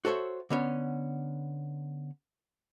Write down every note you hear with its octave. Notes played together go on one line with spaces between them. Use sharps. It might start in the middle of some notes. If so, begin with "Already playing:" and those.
F#4 A4 C5 C#5 E5
D3 B3 C#4